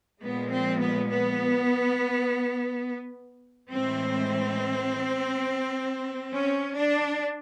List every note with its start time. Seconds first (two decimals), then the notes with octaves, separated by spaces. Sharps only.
0.21 A#2 F3 G#3 B3
0.51 C4
0.80 B3
1.09 B3
3.70 A2 E3 G#3 C4
6.33 C#4
6.76 D4